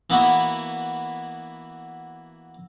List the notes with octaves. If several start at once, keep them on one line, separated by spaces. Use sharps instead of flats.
E3 A#3 B3 E4 F#4 B5